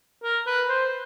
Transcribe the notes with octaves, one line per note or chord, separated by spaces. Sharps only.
A#4
B4
C5